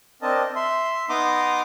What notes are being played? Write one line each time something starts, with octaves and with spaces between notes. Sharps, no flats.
C4 D4 A#4 D#5 A5
E5 C6
B3 D#4 A#5 C6 D6 D#6